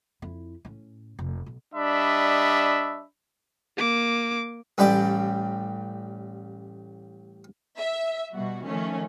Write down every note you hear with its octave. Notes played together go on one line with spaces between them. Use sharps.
F2 E4
A2 C#4
F1
B1
G3 D4 D#5 E5 B5
A#3 D6
A1 G3 B4 D5 G5
E5
B2 G3 F#4
D#3 F3 A3 C#4